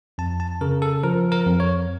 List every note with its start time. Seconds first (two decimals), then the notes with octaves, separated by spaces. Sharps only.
0.18 F2 A5
0.40 A5
0.61 C#3 A#4
0.82 A4
1.04 F3 A#4
1.32 A#4
1.46 F2
1.60 C#5